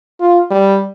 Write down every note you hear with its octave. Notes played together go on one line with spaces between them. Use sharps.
F4
G3